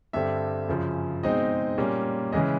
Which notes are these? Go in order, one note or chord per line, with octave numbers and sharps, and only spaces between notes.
G2 D3 G3 C4 E5
F#2 C#3 F3
B2 G#3 C4 D#4 D#5
A#2 G3 A#3 C#4
C#3 E3 G#3 C#4 D#5